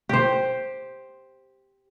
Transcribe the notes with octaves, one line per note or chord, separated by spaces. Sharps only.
G4 C5